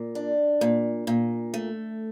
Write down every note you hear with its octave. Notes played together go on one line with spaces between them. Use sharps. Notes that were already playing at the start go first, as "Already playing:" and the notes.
Already playing: A#2
D4
A#2
A#2
A3